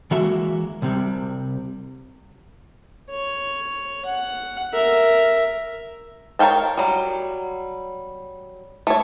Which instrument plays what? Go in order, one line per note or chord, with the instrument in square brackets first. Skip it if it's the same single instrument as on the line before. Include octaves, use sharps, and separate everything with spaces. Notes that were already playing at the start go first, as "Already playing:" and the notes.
[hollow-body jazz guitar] E3 G#3 A#3 F#4 E5
C2 C3 G3
[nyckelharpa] C#5
F#5
A#4 E5
[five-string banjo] A#4 C#5 F5 G5 A5
F#3 G3
A3 C#5